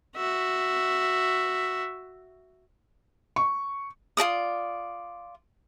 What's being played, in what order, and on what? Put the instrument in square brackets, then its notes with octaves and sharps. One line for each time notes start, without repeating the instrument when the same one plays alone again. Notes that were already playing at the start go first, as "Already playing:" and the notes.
[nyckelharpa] F#4 E5
[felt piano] C#6
[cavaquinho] F4 A4 D5 D#6